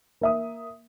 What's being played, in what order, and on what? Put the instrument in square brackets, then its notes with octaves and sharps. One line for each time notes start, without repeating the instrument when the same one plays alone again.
[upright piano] A#3 E5 D#6